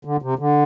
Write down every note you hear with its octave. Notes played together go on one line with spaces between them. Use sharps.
D3
C3
D3